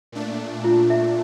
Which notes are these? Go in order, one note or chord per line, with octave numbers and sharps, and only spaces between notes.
A#2 A3 D4
F4
E5